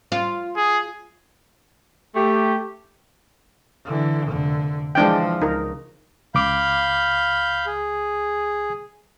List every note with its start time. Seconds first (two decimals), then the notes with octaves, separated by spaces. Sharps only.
0.12 F4
0.56 G#4
2.16 A3 G4
3.85 D3 E3
4.28 F1 D3
4.95 E3 F3 G#3 D4 G5
5.42 C#2 D#4 A#4
6.35 C#2 F5 B5 D6 G6
7.66 G#4